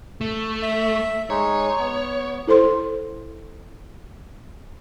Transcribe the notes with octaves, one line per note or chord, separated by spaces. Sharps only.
A3
E5
G#3 D#4 C#5
B3
E4 A4 C5 C6